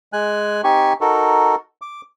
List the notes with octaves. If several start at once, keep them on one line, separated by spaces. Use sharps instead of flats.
G#3 G#5 F#6
C4 D#4 G4 G#5 C#6
D#4 F#4 A4 A#4
D6